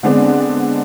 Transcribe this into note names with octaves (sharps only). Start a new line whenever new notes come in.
D3 G#3 B3 C4 D4